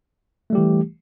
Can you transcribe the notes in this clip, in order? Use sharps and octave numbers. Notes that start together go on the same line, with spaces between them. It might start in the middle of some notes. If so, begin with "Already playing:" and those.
E3 G3 A3 G4